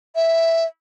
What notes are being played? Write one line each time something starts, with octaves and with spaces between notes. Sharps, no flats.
E5